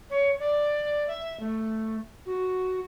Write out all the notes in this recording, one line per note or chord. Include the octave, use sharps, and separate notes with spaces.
C#5
D5
E5
A3
F#4